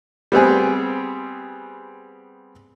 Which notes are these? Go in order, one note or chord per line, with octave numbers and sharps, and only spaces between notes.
G3 B3 C4 G#4